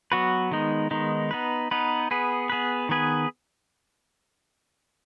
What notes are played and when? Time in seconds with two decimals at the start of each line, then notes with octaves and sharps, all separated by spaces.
0.12 F#3 B3 F#4 B4
0.51 D#3 G#3 B3 D#4
0.91 D#3 G#3 B3 D#4
1.31 B3 D#4 B4
1.71 B3 D#4 B4
2.11 B3 G#4 B4
2.50 B3 G#4 B4
2.89 D#3 B3 G#4 B4